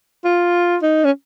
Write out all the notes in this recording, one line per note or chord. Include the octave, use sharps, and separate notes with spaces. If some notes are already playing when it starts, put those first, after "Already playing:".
F4
D#4
C#4